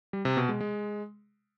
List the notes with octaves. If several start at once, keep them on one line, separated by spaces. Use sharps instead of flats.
G3
C3
B2
G#3
G#3